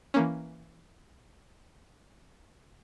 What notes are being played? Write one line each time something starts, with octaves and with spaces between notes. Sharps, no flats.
E3 A#3 C#4